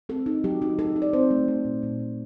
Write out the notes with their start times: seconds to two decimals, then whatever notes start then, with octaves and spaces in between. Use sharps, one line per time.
0.09 C4 A4
0.26 D#4
0.44 F#3 G4
0.62 D#4
0.79 D#4 A4
0.96 D#4
1.02 D5
1.13 C4 C5
1.31 A3
1.48 A3
1.65 A#2
1.83 A#2
2.00 A#2